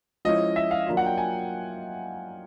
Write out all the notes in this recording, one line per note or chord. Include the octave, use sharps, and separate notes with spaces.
F3 G#3 C#4 E4 D#5
E5
F5
F#3 A#3 D4 F4
F#5
G5
G#5